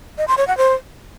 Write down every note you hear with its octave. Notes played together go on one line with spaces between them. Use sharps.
D#5
C6
C#5
F#5
C5